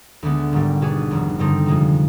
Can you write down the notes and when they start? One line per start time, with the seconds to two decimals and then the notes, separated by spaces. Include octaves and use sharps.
0.22 D2 D3 G#3 B3
0.52 G#1 G#2 G3
0.81 B2 B3 D4 G#4
1.11 F1 F2 D#3
1.39 G2 D3 G3 C4 D#4
1.66 F2 C3 F3 G#3